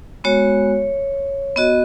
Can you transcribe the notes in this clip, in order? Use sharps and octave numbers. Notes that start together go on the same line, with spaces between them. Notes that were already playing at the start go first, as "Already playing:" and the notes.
G#3 B3 F#4 C#5
B3 F#4 D#5